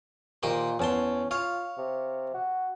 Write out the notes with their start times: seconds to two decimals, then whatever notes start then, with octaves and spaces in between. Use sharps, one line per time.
0.43 A#2 D#3 G4 C5
0.79 E2 C#4 A5 C6
1.31 F4 C#5 F5
1.78 C3
2.34 F#4